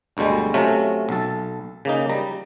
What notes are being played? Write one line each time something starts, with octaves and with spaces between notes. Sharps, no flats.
G1 D2 B2 G3 G#3
C3 F#3 A3 C#4 F4
B1 A4
C#3 A#3 D#4
G3 A#5